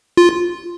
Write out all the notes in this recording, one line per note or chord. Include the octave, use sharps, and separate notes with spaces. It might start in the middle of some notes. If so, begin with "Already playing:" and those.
F4